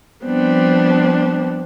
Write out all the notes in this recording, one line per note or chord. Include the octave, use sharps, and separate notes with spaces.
F3 G3 B3 C4 D4